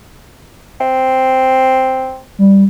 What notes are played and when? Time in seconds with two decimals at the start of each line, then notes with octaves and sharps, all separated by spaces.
0.81 C4
2.39 G3